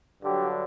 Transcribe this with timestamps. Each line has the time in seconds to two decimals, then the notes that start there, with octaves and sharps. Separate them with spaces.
0.23 G2 D3 F#3 G4